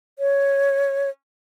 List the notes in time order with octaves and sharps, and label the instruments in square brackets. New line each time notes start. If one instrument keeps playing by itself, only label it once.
[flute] C#5